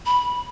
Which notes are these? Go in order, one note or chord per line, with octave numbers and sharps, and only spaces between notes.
B5